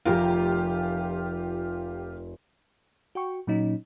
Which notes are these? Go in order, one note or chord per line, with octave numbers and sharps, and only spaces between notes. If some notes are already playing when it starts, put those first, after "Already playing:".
F1 F4 G4 A#4
F#4 G5 C#6
A#2 F#3 C#4 D#4